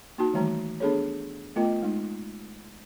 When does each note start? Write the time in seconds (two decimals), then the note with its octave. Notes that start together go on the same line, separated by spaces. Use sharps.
0.18 A#3 D#4 F#4 A5
0.34 D#3 E3 G3 A3 A#5
0.80 B3 D4 G#4 A4 C#5
1.56 A3 B3 F4 A#4 D#5 G5
1.82 G#3 D#4